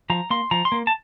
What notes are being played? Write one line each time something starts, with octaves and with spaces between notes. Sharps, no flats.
F3 A#5
A#3 C6
F3 A#5
C6
A#3
A5